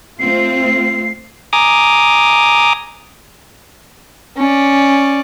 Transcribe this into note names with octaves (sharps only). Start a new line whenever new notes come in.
A3 C4 F4 C7
G#5 A#5 D6 D#6
C#4 D5